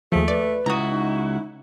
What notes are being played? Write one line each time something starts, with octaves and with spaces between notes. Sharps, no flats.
D#2 F3 A3 G#4
B4 D5
C#2 E4 F#4 A#5 D#6
D#4